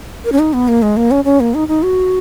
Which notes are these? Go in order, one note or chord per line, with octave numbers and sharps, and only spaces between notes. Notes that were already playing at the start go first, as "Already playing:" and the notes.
A#4
C#4
D#4
B3
A#3
G#3
A#3
C#4
C#4
A#3
D#4
D#4
F#4